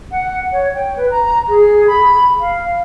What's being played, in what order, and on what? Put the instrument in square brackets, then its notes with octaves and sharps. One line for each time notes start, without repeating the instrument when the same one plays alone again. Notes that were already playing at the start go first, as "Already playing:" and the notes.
[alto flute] F#5
C#5
G5
B4
A#5
G#4
B5
F5